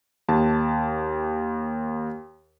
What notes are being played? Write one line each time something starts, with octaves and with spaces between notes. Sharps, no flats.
D#2 A5